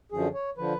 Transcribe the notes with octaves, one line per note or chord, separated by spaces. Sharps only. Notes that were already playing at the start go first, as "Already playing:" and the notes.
F#2 D3 F3 G#4
C#5
D3 F3 B4